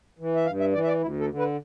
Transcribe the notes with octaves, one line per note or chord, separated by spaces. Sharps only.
E3
E5
G2 F5
E5
E3 D5
E5
D5
D2 E4
A4
D3
B4